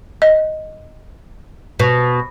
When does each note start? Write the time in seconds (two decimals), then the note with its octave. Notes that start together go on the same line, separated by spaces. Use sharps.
0.22 D#5
1.79 B2